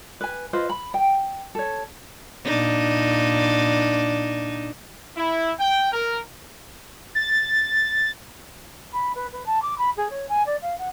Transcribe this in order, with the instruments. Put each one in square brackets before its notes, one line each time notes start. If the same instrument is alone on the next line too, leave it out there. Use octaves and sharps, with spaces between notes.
[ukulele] B4 G#5
F4 B4 C5 D#5
B5
G5
A4 C#5
[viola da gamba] A#2 D4 D#4
[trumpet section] E4
G5
A#4
[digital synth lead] A6
[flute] B5
B4
B4
A5
D6
B5
G#4
C#5
G#5
D5
F5
F#5